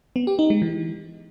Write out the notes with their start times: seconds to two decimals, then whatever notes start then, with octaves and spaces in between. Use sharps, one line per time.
0.16 B3
0.27 G4
0.39 D#4
0.50 G#3
0.62 E3